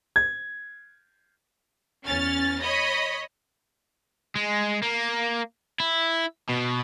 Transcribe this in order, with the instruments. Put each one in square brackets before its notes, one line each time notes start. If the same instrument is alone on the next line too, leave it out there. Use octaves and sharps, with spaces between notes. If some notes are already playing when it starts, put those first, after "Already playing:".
[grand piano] G#6
[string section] E2 C#4 F6 A6
C#5 D#5 B5
[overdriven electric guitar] G#3
A#3
E4
B2